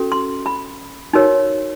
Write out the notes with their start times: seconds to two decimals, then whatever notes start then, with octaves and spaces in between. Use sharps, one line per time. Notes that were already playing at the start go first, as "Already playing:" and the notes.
Already playing: C#4 F#4 A4
0.12 C6
0.46 B5
1.13 D#4 F#4 A#4 C#5